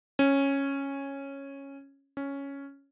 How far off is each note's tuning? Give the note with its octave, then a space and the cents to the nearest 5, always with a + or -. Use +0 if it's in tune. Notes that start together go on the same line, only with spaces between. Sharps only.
C#4 -10
C#4 +0